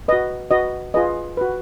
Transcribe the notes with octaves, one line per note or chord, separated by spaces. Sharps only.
F#4 B4 D#5
F#4 B4 D#5
F4 G#4 B4 D#5
F#4 B4